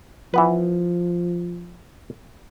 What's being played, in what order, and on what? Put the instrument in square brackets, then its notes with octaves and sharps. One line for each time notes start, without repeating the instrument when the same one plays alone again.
[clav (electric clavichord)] E3 B3 B4 [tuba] F3